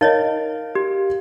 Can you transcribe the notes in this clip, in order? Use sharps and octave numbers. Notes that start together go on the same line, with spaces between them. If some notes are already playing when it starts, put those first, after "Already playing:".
D#4 A#4 C#5 D#5 F5
G4